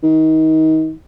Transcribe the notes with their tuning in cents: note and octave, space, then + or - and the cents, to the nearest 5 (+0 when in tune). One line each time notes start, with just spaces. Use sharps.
D#3 +30